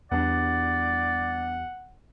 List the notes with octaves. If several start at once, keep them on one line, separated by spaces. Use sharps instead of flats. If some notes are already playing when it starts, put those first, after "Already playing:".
E2 G3 B3 D4 D5 F#5